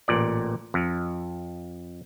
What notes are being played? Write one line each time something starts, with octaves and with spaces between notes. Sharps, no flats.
A1 A#2 D5
F2